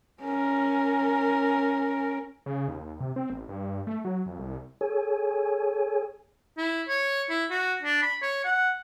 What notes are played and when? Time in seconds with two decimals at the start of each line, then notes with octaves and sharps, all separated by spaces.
0.21 C#4 A#4
2.46 C#3
2.68 D#2
3.00 C3
3.16 C4
3.30 A1
3.49 G2
3.87 A3
4.05 F#3
4.26 F2
4.39 C2
4.81 G#4 A4 C#5 G#5
6.58 E4
6.88 C#5
7.30 E4
7.51 F#4
7.82 D4
8.02 B5
8.22 C#5
8.45 F#5